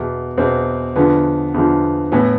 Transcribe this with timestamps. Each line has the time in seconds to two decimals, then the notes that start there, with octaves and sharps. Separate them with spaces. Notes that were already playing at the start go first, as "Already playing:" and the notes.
Already playing: E2 B2
0.37 E2 B2 C4
0.96 E2 D3 F3 B3
1.54 E2 D3 F3
2.12 A2 E3 B3